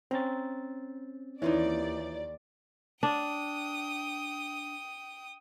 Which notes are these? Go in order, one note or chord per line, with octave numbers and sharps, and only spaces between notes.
C4 C#4 A#5 A6
D#2 E3 D#4 F4 C#5 D5
D4 G5 D#6